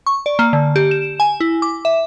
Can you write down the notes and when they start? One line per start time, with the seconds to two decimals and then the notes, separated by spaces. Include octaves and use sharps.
0.07 C#6
0.26 D5
0.39 A#3
0.53 D3
0.76 G4
0.91 E7
1.20 G#5
1.40 E4
1.62 D6
1.85 E5